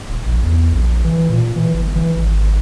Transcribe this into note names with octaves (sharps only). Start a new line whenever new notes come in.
D#1
A#1
E2
A#1
E3
A#2
E3
G1
E3
G#1